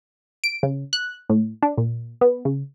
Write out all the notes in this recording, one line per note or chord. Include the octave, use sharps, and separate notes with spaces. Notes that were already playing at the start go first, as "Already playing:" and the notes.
D7
C#3
F#6
A2
D4
A#2
B3
C#3